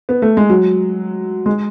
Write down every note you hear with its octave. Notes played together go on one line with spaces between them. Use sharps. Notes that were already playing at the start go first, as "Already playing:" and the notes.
B3
A3
G#3
F#3
G#3